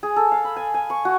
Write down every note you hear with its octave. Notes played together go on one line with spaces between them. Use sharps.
G#4
A4
F5
B5
G#5
G#5
C#6
F#4